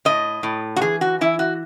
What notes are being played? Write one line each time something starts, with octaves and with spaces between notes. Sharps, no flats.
A2 D#5
A2
F#4
E3 G#4
F#4
E3 E4
F#4